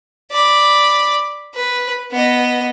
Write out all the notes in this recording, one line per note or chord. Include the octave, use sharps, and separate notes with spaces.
D5 B5
B4
B3 D#5